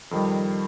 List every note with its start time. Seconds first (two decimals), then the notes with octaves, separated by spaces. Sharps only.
0.11 F2 D#3 G3